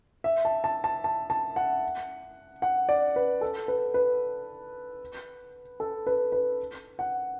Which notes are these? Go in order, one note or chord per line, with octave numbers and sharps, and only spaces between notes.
E5
A5
A5
A5
A5
A5
F#5
F#5
D5
B4
A4
B4
B4
A4
B4
B4
F#5